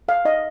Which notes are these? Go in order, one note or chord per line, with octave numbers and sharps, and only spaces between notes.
A4 F5
D#4 D#5